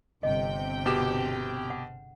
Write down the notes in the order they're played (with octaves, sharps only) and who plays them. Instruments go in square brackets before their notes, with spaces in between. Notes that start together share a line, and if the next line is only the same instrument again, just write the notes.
[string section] G1 C3 G5 [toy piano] D#5
[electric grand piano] B2 G4 E7 [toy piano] G#4
[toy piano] F#5